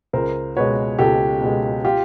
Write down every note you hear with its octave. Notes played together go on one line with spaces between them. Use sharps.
C#2 A#4 C5
B2 G#3 B4 C#5
C#2 G4 A4
B2 G#3
F4 G4